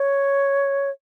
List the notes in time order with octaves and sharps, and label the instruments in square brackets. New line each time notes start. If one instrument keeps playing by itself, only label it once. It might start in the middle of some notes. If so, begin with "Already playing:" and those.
Already playing: [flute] C#5